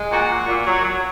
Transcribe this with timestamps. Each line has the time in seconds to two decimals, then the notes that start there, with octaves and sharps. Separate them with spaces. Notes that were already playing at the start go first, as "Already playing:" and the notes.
Already playing: G#3
0.11 A#2 F#4
0.29 A#2
0.46 A#2
0.66 F#3
0.83 F#3